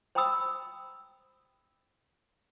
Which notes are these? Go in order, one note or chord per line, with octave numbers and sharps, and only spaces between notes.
C5 G5 A#5 B5 D#6 E6